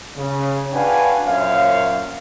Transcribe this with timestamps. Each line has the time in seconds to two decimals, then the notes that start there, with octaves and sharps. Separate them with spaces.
0.17 C#3
0.73 D4 F#4 B4 F5 G5 G#5
1.26 F#2 A#2 C5 C#5 E5 F5